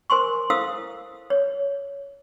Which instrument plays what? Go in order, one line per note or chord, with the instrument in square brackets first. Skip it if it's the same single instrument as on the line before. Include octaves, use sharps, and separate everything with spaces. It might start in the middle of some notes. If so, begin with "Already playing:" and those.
[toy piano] A#4 C5 G#5 C6 C#6
E4 A4 C5 F5 D#6 E6
C#5